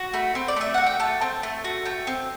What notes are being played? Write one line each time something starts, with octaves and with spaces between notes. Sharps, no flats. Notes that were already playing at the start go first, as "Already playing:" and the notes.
Already playing: F#4
A3 B5
C4
D5
A3 E5
F#4 F#5
G5
A3 A5
C4
A3
F#4
A3 G5
C4